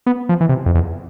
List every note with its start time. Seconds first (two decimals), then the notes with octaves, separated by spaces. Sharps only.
0.06 B3
0.29 F3
0.41 E3
0.49 C3
0.66 F2
0.75 E2